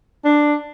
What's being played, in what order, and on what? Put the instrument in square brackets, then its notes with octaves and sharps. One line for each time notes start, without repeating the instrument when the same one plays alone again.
[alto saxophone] D4